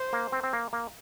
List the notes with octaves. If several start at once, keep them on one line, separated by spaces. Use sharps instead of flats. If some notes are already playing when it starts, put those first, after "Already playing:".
Already playing: C5
A#3
C4
C4
A#3
A#3